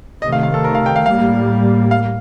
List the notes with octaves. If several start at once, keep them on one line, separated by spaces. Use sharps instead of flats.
C3 D#3 A3 D#5
F5
F5
A4
A#4
F5
G5
F5
A2 G3 A#3 F5
F5